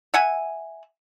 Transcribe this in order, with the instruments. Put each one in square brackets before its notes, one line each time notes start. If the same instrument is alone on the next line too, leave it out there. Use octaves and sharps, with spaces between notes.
[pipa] E5 F#5 G#5